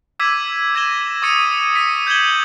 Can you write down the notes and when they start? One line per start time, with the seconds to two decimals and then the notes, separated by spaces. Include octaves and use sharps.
0.20 D6 E6 G#6 B6 D#7
0.75 G#6 A#6 D#7 E7 G7
1.22 C#6 D#6 A6 C#7 D#7
1.75 B6 C#7
2.07 G6 G#6 E7 F#7 G7